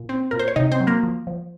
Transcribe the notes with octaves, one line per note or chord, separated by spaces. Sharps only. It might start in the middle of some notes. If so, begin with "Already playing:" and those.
Already playing: A#2
C4
A#2 A#4
C5
C#5
C3 D#4 D#5
C4 C5
F#3
A#3 A#4
F3
F3